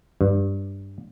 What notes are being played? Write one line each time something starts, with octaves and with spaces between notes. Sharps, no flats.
G2